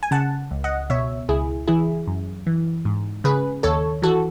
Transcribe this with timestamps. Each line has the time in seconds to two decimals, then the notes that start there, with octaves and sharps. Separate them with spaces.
0.03 G#5
0.11 C#3 F#5 A5
0.51 C#2
0.64 D#5 F#5
0.90 B2 C#5 E5
1.29 C#2 E4 G#4
1.68 E3 E4 G#4
2.07 F#2
2.47 E3
2.85 G#2
3.24 C#3 G#4 B4
3.63 D#2 A4 C#5
4.02 E3 F#4 A4